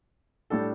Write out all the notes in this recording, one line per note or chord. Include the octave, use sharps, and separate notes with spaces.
A2 G3 D4 A4